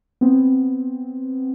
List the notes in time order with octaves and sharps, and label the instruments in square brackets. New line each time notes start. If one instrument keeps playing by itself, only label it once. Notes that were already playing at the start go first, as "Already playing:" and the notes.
[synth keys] B3 C4